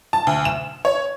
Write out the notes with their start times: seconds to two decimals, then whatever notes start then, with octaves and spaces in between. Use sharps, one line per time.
0.13 A5
0.27 D2
0.45 E7
0.85 C#5